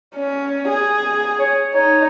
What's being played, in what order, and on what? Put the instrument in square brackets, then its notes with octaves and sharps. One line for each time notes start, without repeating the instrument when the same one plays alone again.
[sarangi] C#4
G#4
[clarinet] C#5
[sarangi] D#4 [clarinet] C#5